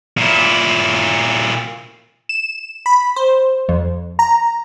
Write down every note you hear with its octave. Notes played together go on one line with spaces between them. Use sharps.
A#2 E4
E7
B5
C5
F2
A#5